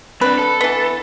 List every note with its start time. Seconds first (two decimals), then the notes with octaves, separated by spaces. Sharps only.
0.21 C4 D4 B4
0.38 A4
0.61 E3 B3